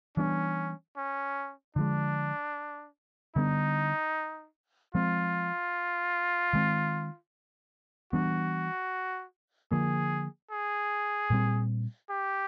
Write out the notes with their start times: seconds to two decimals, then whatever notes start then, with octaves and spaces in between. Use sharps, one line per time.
0.17 E3 G3 B3 C#4 D4
0.97 C#4
1.76 D3 F3 G#3 D4
3.36 D3 G3 B3 D4 D#4
4.95 F3 G#3 C4 F4
6.53 D#3 G#3 C4
8.13 E3 G3 B3 D4 F#4
9.72 D3 F3 A#3 G#4
10.51 G#4
11.30 A#2 G3 C4
12.10 G4